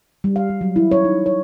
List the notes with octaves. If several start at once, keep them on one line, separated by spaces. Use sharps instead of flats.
G3
F5
G3
F#3
E4
C#5
D#4
C#5